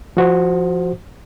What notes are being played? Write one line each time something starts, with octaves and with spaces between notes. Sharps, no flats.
F3 F#4 C5